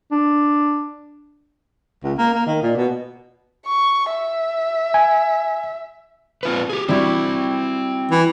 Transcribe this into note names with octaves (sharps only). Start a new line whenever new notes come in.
D4
C#2
A#3
A#3
D#3
A#2
B2
C#6
E5
G#5
C4 F4 B4
G4 G#4
G3 C4 E4 F#4 D5
E3